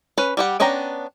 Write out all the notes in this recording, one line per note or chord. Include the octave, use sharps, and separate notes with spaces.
C#4 B4
G3 G4 F#5
B3 C#4 D4 G5 A#5